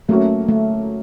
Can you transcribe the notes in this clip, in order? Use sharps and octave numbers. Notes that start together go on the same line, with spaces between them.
F#3 A3 A#3 C#4 F#4
A3